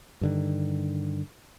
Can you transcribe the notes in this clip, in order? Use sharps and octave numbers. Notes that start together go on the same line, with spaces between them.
G2 D3 D#3